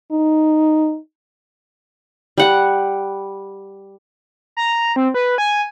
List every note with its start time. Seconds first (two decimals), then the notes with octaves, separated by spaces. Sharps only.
0.12 D#4
2.38 G3 F#5
4.57 A#5
4.96 C4
5.14 B4
5.38 G#5